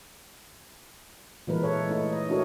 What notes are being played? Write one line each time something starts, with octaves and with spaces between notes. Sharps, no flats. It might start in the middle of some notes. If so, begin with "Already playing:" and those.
A#2 E3 G#3 A#4 B4
E4 A4 C#5
A3 D#4
D#5
D4 E4 F#4 A4 A#4 C#5